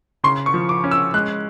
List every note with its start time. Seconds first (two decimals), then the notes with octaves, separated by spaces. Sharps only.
0.24 C#3 C6
0.46 C#6
0.54 F3
0.69 D6
0.84 C#4
0.91 E6
1.14 G#3 F#6